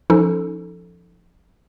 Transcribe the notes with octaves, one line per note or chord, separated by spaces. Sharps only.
F3 C#4 D#4 A4